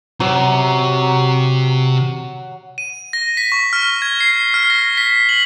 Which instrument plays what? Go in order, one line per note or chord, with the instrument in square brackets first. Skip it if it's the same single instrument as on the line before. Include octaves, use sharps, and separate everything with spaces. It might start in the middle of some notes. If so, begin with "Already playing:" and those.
[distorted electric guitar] C3 [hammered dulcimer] F#3
[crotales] D#7
A#6
B6
C#6
F6
G#6
C7
F6
A#6
B6
F#7